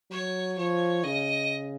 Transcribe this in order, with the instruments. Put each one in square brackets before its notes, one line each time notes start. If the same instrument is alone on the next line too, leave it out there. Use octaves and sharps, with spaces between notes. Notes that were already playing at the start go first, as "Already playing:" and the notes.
[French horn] F#3 [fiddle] C#5
[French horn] F3 [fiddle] C#5
[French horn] C#3 [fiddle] D#5